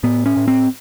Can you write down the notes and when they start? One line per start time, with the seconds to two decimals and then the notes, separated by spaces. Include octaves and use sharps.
0.03 A2 B3
0.26 C#4
0.37 A2
0.48 C4